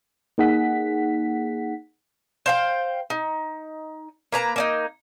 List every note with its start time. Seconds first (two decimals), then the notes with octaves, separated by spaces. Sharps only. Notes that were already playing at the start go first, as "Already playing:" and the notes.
0.38 A#3 D#4 G#4 F#5 B6
2.46 C5 F5 G5
3.10 D#4
4.32 A#3 B4 A#5
4.56 A#3 C#4 D#4